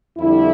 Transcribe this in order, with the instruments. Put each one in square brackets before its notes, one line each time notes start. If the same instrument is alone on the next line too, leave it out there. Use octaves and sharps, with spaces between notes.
[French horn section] F2 D3 G3 E4